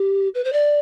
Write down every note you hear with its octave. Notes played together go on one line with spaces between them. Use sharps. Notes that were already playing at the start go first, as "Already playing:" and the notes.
Already playing: G4
B4
C5
D5